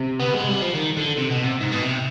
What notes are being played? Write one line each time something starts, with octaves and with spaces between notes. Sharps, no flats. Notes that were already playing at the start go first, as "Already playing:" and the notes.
Already playing: C3
B3
G#3
G3
F3
D#3
D3
C3
B2
C3
G#2
B2
C3